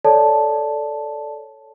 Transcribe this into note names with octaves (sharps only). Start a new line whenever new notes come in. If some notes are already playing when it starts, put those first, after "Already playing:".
A4 C#5 D5 A5